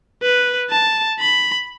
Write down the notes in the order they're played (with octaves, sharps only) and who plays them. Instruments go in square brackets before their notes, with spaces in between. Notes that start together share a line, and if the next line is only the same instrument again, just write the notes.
[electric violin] B4
A5
B5